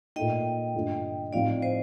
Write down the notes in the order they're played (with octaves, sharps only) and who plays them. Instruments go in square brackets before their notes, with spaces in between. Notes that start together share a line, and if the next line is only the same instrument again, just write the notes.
[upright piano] A#2 A3 D#4 [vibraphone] D#5 G5
[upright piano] G2 D3 A3 D4 F4
[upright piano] A2 F3 C4 D#4 [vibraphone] D5 F5
[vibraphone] C5 D#5